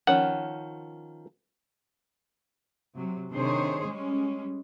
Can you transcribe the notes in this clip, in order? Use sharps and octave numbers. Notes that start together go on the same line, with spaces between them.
D#3 F3 C#4 F#5
C3 F#3
C3 D#3 D4 G#4 C5 C#5
G3 G#3 C#4